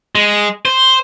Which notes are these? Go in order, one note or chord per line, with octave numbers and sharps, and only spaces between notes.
G#3
C5